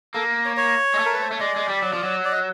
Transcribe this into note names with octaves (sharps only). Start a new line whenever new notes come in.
A#3 A4
C#5
C#5
G#3
A3
A#4
B4
C5
A3 C#5
G#3 D5
G#3
G3
F#3
F3
F#3
D5
D#5